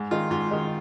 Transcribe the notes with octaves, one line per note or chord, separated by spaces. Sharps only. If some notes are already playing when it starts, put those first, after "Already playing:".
Already playing: G#2
D#3 G#3 F4
G#2 F4
D#3 G#3